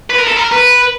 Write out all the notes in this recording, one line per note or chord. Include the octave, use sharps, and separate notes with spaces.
B4
A#4
A4
A#4
B4